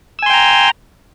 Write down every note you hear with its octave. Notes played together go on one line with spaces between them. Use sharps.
G5 G#5 A#5 C6 E6